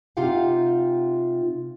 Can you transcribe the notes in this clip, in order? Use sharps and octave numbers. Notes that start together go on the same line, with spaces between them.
C3 D#4 F4 G4 F5 F#5